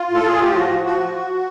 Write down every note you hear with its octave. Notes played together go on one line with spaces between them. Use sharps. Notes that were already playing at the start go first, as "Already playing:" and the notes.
Already playing: F4
A2
A4
A2 G#4
A2 G4
F3 F#4
F3
F3 F#4
F3